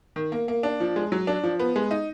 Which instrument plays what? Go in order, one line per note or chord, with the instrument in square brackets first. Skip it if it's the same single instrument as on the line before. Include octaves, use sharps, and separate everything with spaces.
[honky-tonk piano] D#3
A#3
A#3
D4
F3
G#3
F#3
D4
F3
B3
G#3
D#4